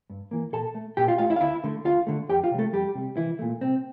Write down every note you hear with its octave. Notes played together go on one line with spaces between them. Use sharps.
G2
E3 A#3
A#2 A4 A5
A3
A#2 G4 G5
F4 F5
A3 F4 F5
E4 E5
F5
D2 E4 E5
D3 A3
D2 F4 F5
D3 A3
F2 G4 G5
F4 F5
C3 G3
A3 A4
F2 G3 G4
C3 G3
C2 E3 E4
A#2 A3
C2 C4